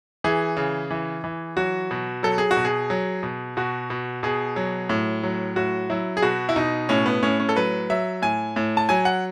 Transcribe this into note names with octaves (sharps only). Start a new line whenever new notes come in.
E3 G#4
C#3
E3
E3
F#3 F#4
B2
F#3 A4
G#4
F#4
B2
G#4
F#3
B2
B2 F#4
B2
B2 G#4
F#3
A2
F#3
A2 F#4
F#3 E4
G#4
B2 F#4
E4
B2 D#4
A2 C#4
B3
A2 C#4
C#4
A4
F#3 B4
F#3 E5
A2 G#5
A2
A5
F#3 G#5
F#5